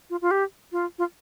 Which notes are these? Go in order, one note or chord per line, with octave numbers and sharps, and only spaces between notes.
F4
F4
G4
F4
F4